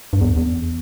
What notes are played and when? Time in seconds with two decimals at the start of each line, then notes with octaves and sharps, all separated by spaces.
0.13 G2
0.21 E2
0.36 E2